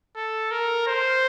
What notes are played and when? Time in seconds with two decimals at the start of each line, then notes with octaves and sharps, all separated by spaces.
0.16 A4
0.51 A#4
0.87 C5